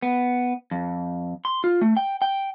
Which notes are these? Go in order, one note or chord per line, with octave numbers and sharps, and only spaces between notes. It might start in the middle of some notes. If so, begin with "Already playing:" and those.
B3
F2
C6
F4
A3
G5
G5